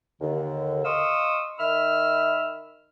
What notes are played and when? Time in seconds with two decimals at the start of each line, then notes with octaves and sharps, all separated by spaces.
0.21 D#2 D3
0.85 D#5 F5 C6 C#6 D#6 E6
1.58 D#3 E5 B5 E6 F6